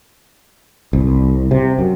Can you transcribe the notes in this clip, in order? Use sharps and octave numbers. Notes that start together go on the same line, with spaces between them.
C2
C3
F#2